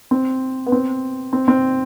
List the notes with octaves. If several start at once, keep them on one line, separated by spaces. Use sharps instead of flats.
C4
B3
C4
C4
C4